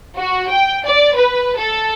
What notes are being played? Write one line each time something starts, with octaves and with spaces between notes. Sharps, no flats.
F#4
G5
D5
B4
A4